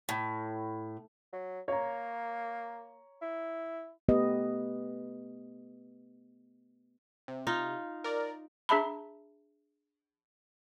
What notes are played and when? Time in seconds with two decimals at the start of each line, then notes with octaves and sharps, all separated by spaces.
0.09 A2
1.33 F#3
1.68 A#3 C#5 A#5
3.21 E4
4.09 A3 B3 G4 B4 D#5
7.28 C3
7.47 D#4 F4
8.04 A#4 D5
8.69 D4 G#4 E5 A5 B5